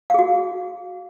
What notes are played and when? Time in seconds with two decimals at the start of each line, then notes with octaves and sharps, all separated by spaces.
0.10 F5
0.14 G#4
0.19 F#4